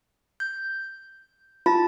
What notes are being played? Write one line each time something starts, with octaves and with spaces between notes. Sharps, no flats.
G6
F4 A5 A6